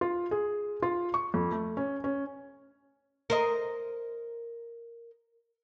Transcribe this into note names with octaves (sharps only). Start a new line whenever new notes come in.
F4
G#4
F4
C#6
F2
A3
C#4
C#4
A#4 C5 D#5